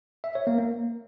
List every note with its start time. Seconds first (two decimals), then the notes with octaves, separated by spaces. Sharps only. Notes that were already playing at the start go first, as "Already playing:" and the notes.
0.24 E5
0.35 C#5
0.47 A#3
0.58 A#3